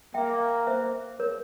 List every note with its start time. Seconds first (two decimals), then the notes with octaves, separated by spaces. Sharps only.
0.14 A#3 E5 G5
0.67 C5 E5
1.20 A#4 C#5